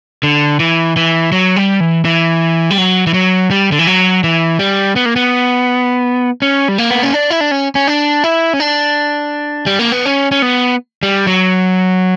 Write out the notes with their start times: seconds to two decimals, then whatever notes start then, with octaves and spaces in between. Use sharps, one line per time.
0.23 D3
0.60 E3
0.96 E3
1.32 F#3
1.56 G3
1.80 E3
2.05 E3
2.70 G3
2.78 F#3
3.07 E3
3.14 F#3
3.51 G3
3.72 D3
3.79 E3
3.87 F#3
4.24 E3
4.59 G3
4.96 B3
5.06 A#3
5.16 B3
6.42 C#4
6.68 G3
6.78 A#3
6.91 B3
7.03 C#4
7.14 D4
7.30 E4
7.41 D4
7.51 C#4
7.75 C#4
7.87 D4
8.24 E4
8.53 C#4
8.60 D4
9.66 G3
9.79 A#3
9.92 B3
10.05 C#4
10.32 C#4
10.42 B3
11.03 G3
11.27 F#3